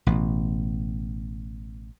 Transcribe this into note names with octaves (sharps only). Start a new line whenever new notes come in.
A1 B2